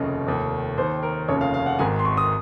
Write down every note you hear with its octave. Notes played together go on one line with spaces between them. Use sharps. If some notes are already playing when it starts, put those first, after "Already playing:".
Already playing: F1 D#2 C#3 D#5
F1 D#2 D#3
D#2 D#3 C5
A#4
F1 D#2 C#3 C#5
F5
F5
F#5
G#1 G#2 D#3 G#5
C6
C#6
D#6